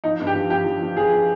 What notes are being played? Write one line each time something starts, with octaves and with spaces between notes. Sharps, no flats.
F3 D#4
G2
G4
F3
F3 G4
F3
F3
F3 G#4
F3